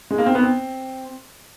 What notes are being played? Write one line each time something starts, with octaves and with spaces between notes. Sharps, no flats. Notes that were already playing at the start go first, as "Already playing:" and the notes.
G#3
A#3
C4
B3
C4